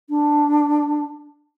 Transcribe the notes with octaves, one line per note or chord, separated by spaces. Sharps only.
D4